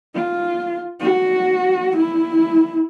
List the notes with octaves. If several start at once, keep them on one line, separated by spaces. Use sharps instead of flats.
F4
F#4
E4